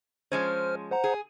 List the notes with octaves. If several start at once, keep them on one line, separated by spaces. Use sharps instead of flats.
F3 G#3 C#4 C5 F6
C5 F#5 A#5
G#4